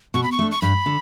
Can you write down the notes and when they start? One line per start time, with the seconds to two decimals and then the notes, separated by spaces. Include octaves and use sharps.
0.14 B2 C#6
0.23 B5
0.32 C#6
0.39 A3 D4
0.51 C#6
0.62 G2 B5
0.86 D3